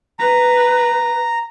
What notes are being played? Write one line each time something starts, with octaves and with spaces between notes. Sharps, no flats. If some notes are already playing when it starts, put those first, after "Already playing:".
B4 A#5